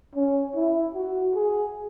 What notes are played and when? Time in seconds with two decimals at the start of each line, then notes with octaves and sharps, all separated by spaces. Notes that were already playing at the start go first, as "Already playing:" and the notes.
0.15 C#4
0.55 E4
0.95 F#4
1.35 G#4